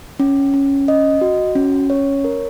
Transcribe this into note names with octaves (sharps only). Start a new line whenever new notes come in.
C#4
C#4
D#5
F#4
C#4
C#5
A#4